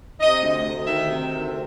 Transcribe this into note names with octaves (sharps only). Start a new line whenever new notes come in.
C3 D#5
D2
D2
D#3 E5
C3
D2